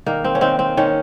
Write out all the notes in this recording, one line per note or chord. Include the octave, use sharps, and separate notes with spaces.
D#3 A#3
C4
C#4
D#3 C4
C4
D#3 C#4